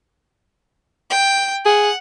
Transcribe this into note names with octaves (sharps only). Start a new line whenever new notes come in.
G5
G#4 F#5